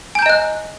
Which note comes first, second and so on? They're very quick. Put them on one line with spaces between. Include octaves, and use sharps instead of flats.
G#5 G6 A#5 D#5 F#6